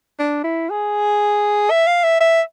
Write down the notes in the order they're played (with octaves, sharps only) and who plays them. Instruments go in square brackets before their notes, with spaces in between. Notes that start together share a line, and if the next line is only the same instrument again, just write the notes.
[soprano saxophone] D4
E4
G#4
E5
F5
E5
E5